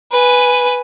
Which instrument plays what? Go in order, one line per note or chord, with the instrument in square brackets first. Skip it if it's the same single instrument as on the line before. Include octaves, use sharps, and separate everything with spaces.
[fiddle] B4 G#5